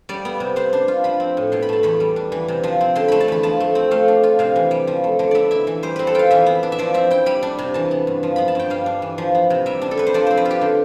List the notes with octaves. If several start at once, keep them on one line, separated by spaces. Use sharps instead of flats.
G3 D5
B3
C3
B3 C5
D4
F4
F3 B5
C4
A2
B2 C6
B5
A3 A5
E2 B5
G3
D4
E3
C3
F3
C4
D3 C6
A3 B5
A5
E2 B5
F3 A5
A3
C4
A3 F5
D4
F4
C3 F5
E3
G3
F3
A3
D3
B3 D5 E5
E4 E5
E3
G3 C5
C4 B4
A4
F4 F5 G5
E3 E5
B3
D4
E5
F3 D5
C4 E5
E4 G5
G3 B5
D4
C3
E3 A5
B3
G2
F3
B3 B5
A5
G2 G5
G3 F5
D4
E3
F3
B3
C3
G3 E5
D4
A4
C3 B4
C5
F3 D5
C4 C5
B4
F4
G4
D3